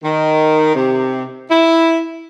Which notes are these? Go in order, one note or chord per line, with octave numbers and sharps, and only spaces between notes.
D#3
C3
E4